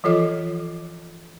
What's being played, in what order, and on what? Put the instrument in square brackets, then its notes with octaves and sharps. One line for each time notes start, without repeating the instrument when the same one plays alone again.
[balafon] E3 F3 F4 A4 D#5 D6